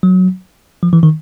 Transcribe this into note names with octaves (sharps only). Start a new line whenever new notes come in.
F#3
F3
E3
D#3